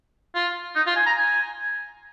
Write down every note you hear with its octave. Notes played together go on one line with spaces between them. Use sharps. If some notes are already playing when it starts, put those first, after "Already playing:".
F4
D#4
F4
G#5
A#5
G#5